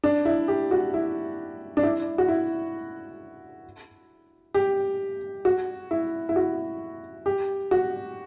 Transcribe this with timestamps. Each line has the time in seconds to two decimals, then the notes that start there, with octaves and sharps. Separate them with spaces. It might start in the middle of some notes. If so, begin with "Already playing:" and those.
0.04 D4
0.25 E4
0.48 G4
0.71 F#4
0.94 E4
1.77 D4
1.83 E4
2.18 F#4
2.28 E4
4.54 G4
5.45 F#4
5.91 E4
6.29 E4
6.36 F#4
7.26 G4
7.71 F#4